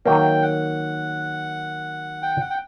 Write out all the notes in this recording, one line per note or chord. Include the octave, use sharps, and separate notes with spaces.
D#3 F#3 A#3 G5
F#5
G5
F#5
G5